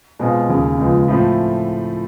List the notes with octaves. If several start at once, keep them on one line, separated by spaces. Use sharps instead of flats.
B2 G#3 C4 F4
D#2 C#3 F#3
C#2 C#3 F3 G#3 B3
A2 F3 A3 C4 E4